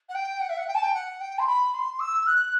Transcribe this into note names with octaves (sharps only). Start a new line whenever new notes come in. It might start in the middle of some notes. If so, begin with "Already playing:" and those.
F#5
G5
F#5
E5
F#5
G5
A5
G5
F#5
G5
C6
B5
C6
E6
F#6